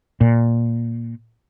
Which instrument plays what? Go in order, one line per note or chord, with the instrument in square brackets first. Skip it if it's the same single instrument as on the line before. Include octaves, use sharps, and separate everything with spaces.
[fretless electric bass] A#2